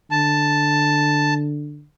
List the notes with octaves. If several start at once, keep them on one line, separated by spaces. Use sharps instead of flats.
D3 A5